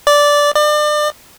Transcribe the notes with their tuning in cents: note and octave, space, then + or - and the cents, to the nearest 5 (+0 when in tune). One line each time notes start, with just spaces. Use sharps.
D5 -10
D5 +35